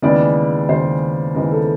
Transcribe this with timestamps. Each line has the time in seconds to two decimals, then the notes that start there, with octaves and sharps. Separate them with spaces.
0.02 D#2 C#3 E3 G#3 B3 D5
0.68 D#2 C#3 E3 G#3 B3 C5
1.35 D#2 C#3 E3 G#3 B3 A#4
1.52 A4